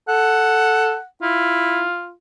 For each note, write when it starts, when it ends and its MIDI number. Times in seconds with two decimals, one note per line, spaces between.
0.08 0.95 69
0.08 1.05 78
1.22 1.86 64
1.22 2.12 65